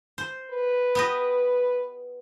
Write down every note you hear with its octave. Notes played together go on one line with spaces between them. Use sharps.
C5
B4
B3 G4 D#5